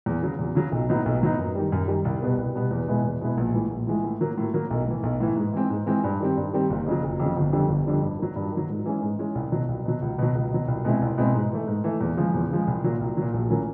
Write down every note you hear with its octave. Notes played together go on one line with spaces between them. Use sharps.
E2
C#3 F#3
E2
C#3 F#3
B1
A2 F#3 B3 D#4
B1
A2 F#3 B3 D#4
F#2
D#3 G3
F#2
D#3 G3
C2
B2 G3 B3
C2
B2 G3 B3
E2
B2 G#3 B3 E4
E2
B2 G#3 B3 E4
A#1
A2 E3 G#3
A#1
A2 E3 G#3
A2
F#3 A#3
A2
F#3 A#3
B1
A2 E3
B1
A2 E3
G#2
E3 G#3 C4
G#2
E3 G#3 C4
G2
D#3 G3 C4
G2
D#3 G3 C4
F#1
F2 C#3 F#3
F#1
F2 C#3 F#3
G1
F2 D3 G3
G1
F2 D3 G3
G2
D#3 F#3
G2
D#3
F#3
G#2
E3 G#3 C#4
G#2
E3 G#3 C#4
C2
B2 F#3
C2
B2 F#3
C#2
B2 F#3
C#2
B2 F#3
C2
B2 G#3 C4 E4
C2
B2 G#3 C4 E4
G#2
E3 A3
G#2
E3 A3
E2
C#3 F3 G#3
E2
C#3 F3 G#3
C2
A#2 F#3
C2
A#2 F#3
A#1
A2 F#3 A#3 C#4